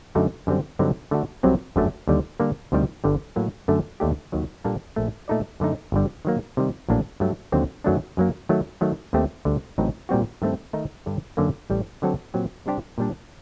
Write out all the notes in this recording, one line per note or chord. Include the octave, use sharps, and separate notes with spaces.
F#2 D3 A3 D#4 F#4
F#2 D3 G3 C4
G2 D3 F#3 C4 D#4
D3 A3 D4 F#4
C2 C3 F#3 C4
G1 F#2 D3 F#3 A3
D#2 D3 G3
D3 G3 A#3 D4 A4
D2 C3 D#3 G3
G1 G2 D3 G3
A2 F#3 A#3
F#2 D3 A3 D4
D#2 D3 A3 D4 G4
D#2 D#3 F#3
A#2 G3 A#3 D4 A4
A#1 A#2 A3
A#2 A3 D#4 A4 D5
F#2 D3 F#3 A3 D#4
G1 G2 D3 G3
D#3 F#3 A#3
C3 D#3 G3
A#1 A2 F#3 A#3 D4
G2 F#3 A3
D#2 D3 F#3 C4
F#2 D#3 F#3 A3 D4
F#2 F#3 A#3
D#3 F#3 A3
D#3 F#3 A3
D#2 D#3 A3 C4 G4
D2 D3 G3
A1 A2 F#3 C4 D#4
A#2 G3 C4 F#4
G2 D#3 A3 C4
D#3 A3 D#4
G2 D3 G3
F#2 D3 F#3 A#3
A1 A2 G3
D3 F#3 C4 F#4 A4
A#2 F#3 C4 G4
C3 G3 D4 G4 C5
A#2 G3 D4